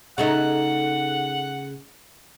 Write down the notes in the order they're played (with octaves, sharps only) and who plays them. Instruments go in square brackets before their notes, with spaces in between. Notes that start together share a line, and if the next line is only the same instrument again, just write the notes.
[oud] C#3 A3 D#4 [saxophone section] F#5